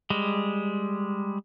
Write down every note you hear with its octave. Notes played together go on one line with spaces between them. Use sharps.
G3 G#3